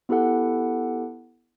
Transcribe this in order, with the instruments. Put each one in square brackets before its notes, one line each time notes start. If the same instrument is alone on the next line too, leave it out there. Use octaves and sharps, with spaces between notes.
[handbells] B3 E4 G4 A4 F#5